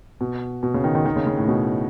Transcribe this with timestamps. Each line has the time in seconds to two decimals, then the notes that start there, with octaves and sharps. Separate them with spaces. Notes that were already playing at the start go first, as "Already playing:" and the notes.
0.21 B2
0.63 B2
0.74 C#3
0.84 D#3
0.95 D#3
1.05 D#3
1.16 C#3
1.26 C#3
1.37 A2
1.48 B2